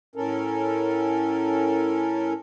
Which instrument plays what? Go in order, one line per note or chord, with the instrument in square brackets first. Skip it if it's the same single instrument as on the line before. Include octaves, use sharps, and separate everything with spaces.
[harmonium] A2 C#4 A4 A#4